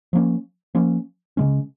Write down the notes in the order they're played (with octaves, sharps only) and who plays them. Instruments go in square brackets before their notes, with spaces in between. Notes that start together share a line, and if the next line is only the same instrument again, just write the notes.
[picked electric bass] F3 A#3 C#4
F3 A#3 C#4
C#3 G#3 C#4